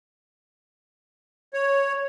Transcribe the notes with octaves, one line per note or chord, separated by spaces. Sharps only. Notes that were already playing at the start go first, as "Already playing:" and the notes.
C#5